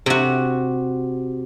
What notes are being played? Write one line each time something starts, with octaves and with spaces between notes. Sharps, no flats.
C3 F#4